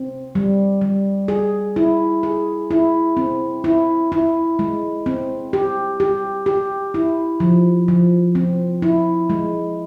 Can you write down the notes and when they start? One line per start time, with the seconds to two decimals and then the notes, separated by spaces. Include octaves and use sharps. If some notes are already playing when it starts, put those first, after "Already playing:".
Already playing: C4
0.35 G3
0.81 G3
1.28 G#4
1.76 E4
2.23 G#4
2.71 E4
3.17 C4
3.64 E4
4.12 E4
4.59 G#3
5.06 C4
5.53 G4
6.00 G4
6.46 G4
6.94 E4
7.40 F3
7.88 F3
8.35 C4
8.82 E4
9.30 G#3